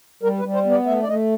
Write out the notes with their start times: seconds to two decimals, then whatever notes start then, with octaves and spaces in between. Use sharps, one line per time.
0.23 G3 A#4
0.39 B4
0.44 G3
0.54 C5
0.66 B3
0.71 D5
0.86 A3 E5
1.02 D5
1.09 A3 D#5